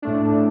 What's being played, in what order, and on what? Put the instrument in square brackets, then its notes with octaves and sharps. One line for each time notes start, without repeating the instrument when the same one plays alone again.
[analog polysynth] A2 A3 D4